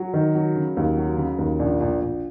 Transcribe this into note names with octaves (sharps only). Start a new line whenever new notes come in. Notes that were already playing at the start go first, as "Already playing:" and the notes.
Already playing: F#3
D#3
F#3
C#3
D#2
F#3
C#3
D#2
A#1
A#1
A#1